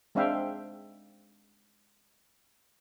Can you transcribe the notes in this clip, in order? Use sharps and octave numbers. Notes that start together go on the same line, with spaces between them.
G#3 C4 D4 E5 F5 G5